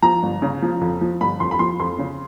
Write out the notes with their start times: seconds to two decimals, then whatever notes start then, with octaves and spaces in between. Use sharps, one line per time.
0.02 F3 A#5
0.23 G1
0.42 C#3
0.62 F3
0.81 F2
1.01 F3
1.21 G1 B5
1.40 F2 C6
1.51 B5
1.59 F3 C6
1.80 F2 C6
1.99 C#3